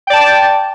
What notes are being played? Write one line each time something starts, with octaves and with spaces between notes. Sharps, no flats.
D5 G5 A5